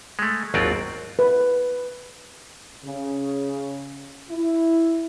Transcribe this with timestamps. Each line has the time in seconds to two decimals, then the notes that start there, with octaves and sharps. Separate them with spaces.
0.19 G#3 A3
0.54 G#1 D#2 F#3 C4 F4 D5
1.19 B4
2.84 C#3
4.30 E4